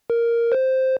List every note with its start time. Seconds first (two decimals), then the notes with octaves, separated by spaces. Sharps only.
0.10 A#4
0.52 C5